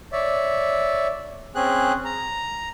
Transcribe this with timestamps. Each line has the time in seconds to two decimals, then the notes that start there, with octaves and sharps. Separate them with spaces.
0.12 C#5 D5 E5
1.55 C4 C#4 G#4 F#6
2.05 A#5